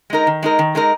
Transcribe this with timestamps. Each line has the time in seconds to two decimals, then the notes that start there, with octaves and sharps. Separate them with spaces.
0.10 G#3 D#4 A#4
0.27 D#3
0.43 G#3 D#4 A#4
0.59 D#3
0.75 G#3 D#4 A#4